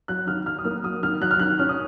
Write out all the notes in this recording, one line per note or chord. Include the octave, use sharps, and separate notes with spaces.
F#3 F#6
D#3 F6
F#3 F6
D#6
A#3 F6
F#3 D#6
D#3 F6
F#3 F#6
F6
D#3 F#6
C#4 F6
D#6